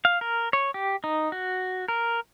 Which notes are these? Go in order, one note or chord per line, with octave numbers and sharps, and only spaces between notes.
F5
A#4
C#5
G4
D#4
F#4
A#4